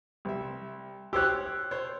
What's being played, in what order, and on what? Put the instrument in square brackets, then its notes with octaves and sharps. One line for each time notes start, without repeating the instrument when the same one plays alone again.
[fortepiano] C2 E5
[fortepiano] G4 C5 C#5 [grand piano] E6 F#6
[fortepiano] C5 C#5